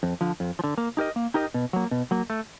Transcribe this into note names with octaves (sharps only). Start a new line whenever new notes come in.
F2
D3 F3
F2
F3
D3
A#3
D#4 G4 A#4 D#5
A#3
D#4 G4 A#4 D#5
B2
F#3 A#3
B2
F#3 A#3
A3